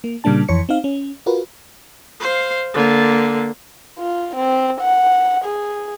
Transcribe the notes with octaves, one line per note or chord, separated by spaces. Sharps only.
A#3
A#2 C#3 G3 A#3 D4 A5
F2 E3 C#5 C#7
C4 D#4 F5
C#4
F4 F#4 A#4 B4
C5 F5
D3 A#3
F4
C4
F#5
G#4